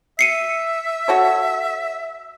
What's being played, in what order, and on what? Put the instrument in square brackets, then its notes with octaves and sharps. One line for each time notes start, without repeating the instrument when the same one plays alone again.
[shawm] E5 [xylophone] C7 C#7 D#7
[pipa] F#4 A4 C#5